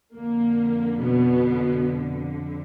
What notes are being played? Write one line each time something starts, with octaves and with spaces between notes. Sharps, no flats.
F2 D3 A#3
B2 B3